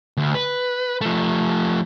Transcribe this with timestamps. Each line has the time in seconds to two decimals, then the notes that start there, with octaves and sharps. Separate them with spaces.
0.17 D2
0.35 B4
1.01 F3 A3